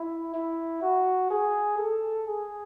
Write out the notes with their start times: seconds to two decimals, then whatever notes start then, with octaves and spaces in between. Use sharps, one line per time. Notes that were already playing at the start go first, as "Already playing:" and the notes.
Already playing: E4
0.34 E4
0.82 F#4
1.30 G#4
1.78 A4
2.27 G#4